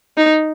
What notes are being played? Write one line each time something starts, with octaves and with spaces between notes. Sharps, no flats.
D#4